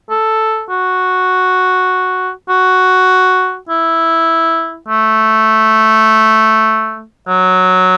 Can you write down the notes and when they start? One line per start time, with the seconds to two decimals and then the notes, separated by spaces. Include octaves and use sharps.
0.10 A4
0.70 F#4
2.49 F#4
3.69 E4
4.88 A3
7.28 F#3